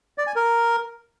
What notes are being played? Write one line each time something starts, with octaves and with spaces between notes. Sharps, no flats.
D5
G#5
A#4